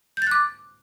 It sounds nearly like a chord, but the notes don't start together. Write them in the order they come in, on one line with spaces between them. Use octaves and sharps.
G6 A6 F#6 D6